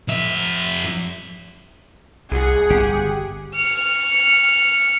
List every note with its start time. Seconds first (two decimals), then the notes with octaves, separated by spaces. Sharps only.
0.08 F2 E5
2.32 C2 G#4 F#5
2.70 G1 G4
3.55 F6 C#7